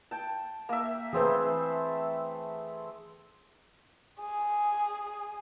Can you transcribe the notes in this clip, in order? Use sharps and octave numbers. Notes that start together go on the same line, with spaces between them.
G5 A5
A#3 E5
E3 A3 C4 G#4 B4
G#4